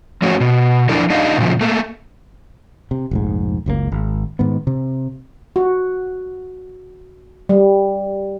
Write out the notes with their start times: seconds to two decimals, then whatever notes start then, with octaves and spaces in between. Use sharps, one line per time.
0.22 F3 F#3 A3 C#4 F#4 C#5
0.40 B2
0.89 F3 D4 E4 A4 A#4 D5
1.10 D4 D#4 D#5 F5
1.38 A#2 C#3 F3
1.61 A3 A#3
2.91 C3
3.11 F1 A#1 G#2
3.66 F#1 C#2 B2 A#3
3.92 G#1
4.39 G#2 D#3 B3
4.67 C3
5.56 F#4
7.49 G3